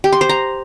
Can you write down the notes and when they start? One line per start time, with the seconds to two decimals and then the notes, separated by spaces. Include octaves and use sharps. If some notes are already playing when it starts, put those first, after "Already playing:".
0.04 G4
0.12 C6
0.21 C5
0.29 A#5